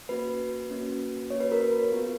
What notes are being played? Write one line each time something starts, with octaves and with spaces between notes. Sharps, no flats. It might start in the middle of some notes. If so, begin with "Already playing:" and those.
A#3 C#4 F#4 B4
A#3 C#4 F#4
A#3 C#4 F#4 C#5
B4
A#4
B4
B3 F4 G#4